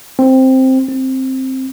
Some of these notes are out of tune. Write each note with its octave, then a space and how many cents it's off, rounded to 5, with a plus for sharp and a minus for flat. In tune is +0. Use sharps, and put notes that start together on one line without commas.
C4 +0
C4 +5